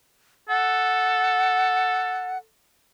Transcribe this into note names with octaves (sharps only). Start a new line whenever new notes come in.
A4 F#5